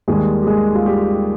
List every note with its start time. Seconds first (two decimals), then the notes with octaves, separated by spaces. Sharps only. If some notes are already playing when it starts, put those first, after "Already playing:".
0.08 D#2 D#3 G3 G#3 G#4
0.43 G4
0.47 G#3 G#4
0.75 F4
0.86 G3 G4